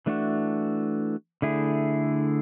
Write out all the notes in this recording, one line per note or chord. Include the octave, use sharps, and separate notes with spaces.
E3 A3 D4 F#4
D3 A3 E4 G#4